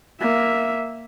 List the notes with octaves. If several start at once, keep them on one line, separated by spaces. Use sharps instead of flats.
A#3 E5